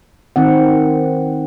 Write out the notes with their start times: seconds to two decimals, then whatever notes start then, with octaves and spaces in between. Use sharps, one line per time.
0.36 D#3 C4 F#5